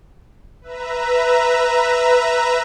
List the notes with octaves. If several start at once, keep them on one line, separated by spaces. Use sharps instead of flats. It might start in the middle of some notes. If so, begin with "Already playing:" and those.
B4 E5 A#5